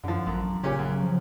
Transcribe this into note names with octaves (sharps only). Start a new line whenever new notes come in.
F#2 D3 F3
A1 F#2
A#2 C#3 C#4 G4
F#2
F3